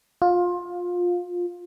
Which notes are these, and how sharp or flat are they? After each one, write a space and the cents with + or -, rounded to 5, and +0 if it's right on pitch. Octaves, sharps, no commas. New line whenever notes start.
F4 +20